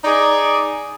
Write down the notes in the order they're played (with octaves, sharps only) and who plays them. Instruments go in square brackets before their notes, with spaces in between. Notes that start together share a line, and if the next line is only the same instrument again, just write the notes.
[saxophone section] D#4 G#4 D5